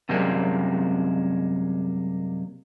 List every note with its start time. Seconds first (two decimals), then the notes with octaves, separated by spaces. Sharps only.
0.09 F#2 C3 G3 G#3 A#3 C4